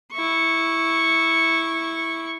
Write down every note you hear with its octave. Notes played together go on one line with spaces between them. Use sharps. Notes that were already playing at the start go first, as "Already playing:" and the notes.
E4 C#6